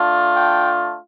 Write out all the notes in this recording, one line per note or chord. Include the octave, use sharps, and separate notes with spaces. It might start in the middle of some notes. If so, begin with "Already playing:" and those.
Already playing: A3 D4 F4
G5